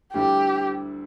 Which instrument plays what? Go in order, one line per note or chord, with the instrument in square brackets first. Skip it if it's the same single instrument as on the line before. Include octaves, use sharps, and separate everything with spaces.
[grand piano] D2 D3 G3 E4 [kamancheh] G4